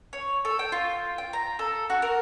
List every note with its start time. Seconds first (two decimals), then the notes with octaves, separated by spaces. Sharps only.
0.13 C#5
0.45 A4
0.59 G5
0.72 F4
1.18 G5
1.33 A#5
1.59 A4
1.90 F#4
2.02 A#4